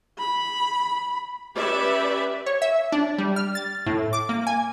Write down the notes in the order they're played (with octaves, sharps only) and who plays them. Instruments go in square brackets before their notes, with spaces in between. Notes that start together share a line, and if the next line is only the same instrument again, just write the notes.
[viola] B5
[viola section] C#4 G4 B4 D5 E5
[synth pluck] C#5
E5
D4
G3
F6
A6
A2
D6
A#3
G#5